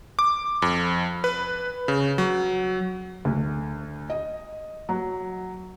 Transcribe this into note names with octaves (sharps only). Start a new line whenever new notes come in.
D6
F2
B4
C#3
F#3
D2
D#5
F#3